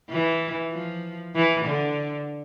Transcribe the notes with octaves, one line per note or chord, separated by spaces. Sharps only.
E3
F3
E3
D3